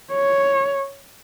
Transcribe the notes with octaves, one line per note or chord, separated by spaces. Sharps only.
C#5